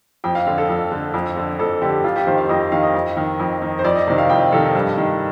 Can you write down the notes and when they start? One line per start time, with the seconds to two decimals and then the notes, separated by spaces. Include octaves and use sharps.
0.24 F2 G5
0.35 F5
0.47 D3 F5
0.58 A4
0.69 F2
0.92 D3
1.14 F2
1.37 D3
1.59 F2 A4
1.82 D3 G4
2.04 F2 F4
2.16 G4
2.27 D#3 C5
2.38 F5
2.49 F2 D#5
2.72 D#3 F5
2.83 D#5
2.94 F2
3.17 D#3
3.40 F2
3.62 D#3
3.79 C5
3.84 F2 D5
3.95 D#5
4.08 C3 D#3
4.18 F5
4.30 F2 G5
4.52 C3 D#3 A4
4.75 G2
4.97 D#3